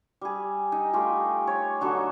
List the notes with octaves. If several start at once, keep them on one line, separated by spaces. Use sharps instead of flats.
G3 G#4
D#4
A3 F4 G4 G#4
C#5
D3 F#3 D#4 A4